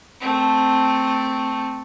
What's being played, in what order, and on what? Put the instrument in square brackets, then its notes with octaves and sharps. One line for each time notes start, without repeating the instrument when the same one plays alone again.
[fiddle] A3 C4